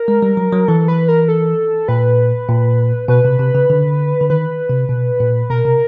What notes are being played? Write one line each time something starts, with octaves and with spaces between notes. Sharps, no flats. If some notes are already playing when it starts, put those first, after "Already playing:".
Already playing: A#4
G#3
G3
F#3
F#3
E3 A4
B4
A#4
A4
A#2 B4
A#2
B2 B4
C3
C3
C#3
D3
D3
D#3 B4
C3
B2
A#2
B2 A#4
C3